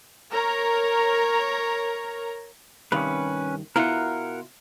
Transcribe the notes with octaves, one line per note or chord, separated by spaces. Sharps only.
A#4 C#5 A#5
G2 C3 D#3 C#4 B4
B2 E4 F4 A#4 F#5